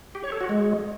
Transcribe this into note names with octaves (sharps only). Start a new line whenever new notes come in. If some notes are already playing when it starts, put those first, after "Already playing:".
G4
C#5
A4
F#4
G#3